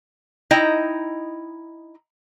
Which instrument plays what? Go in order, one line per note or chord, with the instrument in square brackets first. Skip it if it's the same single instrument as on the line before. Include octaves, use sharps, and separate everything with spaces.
[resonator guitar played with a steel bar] D#4 E4 D#5 G5 A#5